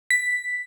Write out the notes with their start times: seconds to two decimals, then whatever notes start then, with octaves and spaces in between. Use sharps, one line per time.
0.10 B6